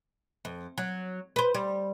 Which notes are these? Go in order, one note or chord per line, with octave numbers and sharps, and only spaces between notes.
F2
F#3
B4 C5
G3